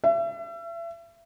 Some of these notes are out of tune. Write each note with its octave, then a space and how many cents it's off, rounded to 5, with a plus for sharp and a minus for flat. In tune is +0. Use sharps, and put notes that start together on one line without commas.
E5 +35